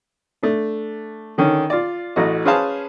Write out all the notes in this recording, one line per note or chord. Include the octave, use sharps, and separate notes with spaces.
A3 D4
D3 D#3 C#4
F4 D5
A1 A3 F#4 D#5
C#4 G#4 B4 C5 F5 A5